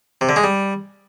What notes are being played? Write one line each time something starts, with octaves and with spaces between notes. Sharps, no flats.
C3
D3
G#3
G3